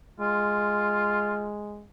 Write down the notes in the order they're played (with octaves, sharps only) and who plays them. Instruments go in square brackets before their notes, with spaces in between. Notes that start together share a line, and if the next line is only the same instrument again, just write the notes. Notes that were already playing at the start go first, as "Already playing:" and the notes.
[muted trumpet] G#3 [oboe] F4